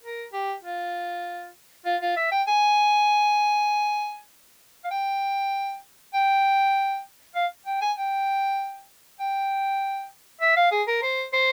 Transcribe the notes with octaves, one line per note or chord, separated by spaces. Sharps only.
A#4
G4
F4
F4
F4
E5
G5
G#5
F5
G5
G5
F5
G5
G#5
G5
G5
E5
F5
G#4
A#4
C5
C5